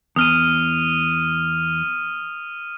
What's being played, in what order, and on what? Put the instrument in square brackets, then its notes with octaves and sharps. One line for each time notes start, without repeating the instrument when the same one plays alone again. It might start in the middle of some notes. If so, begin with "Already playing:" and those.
[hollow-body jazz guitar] E2 [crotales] D#6 F6 D#7